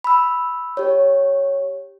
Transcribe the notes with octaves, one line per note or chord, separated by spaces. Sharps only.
B5 E6
G4 C#5